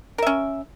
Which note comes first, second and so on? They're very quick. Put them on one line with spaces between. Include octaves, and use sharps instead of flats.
A#4 E5 C#4